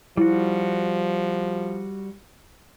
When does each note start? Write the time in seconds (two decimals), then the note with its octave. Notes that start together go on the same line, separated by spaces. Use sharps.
0.17 F3 G3 E4 F#4